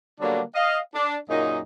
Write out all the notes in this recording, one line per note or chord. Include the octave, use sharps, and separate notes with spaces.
D3 F#3 G3 A#3 B3 D4
D#5 F5
D4
F#2 A#2 A#3 D#4 G#4 D#5